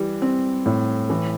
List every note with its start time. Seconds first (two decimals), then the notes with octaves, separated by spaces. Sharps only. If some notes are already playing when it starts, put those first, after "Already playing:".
Already playing: E3 G3
0.22 C4
0.66 A2
1.10 E3